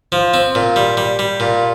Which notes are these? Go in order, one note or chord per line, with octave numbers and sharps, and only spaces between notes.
F3
C4
A#2
G3
G3
G3
A#2